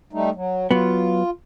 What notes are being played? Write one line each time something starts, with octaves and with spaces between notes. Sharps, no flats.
G3 A3 D#4
F#3
F#3 B3 F4